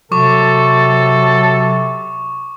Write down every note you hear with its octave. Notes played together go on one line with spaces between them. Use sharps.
C3 F#3 A4 C#6 D6